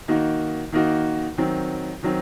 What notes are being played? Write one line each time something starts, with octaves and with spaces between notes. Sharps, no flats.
D#3 A#3 D#4 F#4
D#3 A#3 D#4 F#4
D#3 F#3 C4
D#3 F#3 C4